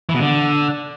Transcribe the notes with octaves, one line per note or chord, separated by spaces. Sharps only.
E3
B2
D3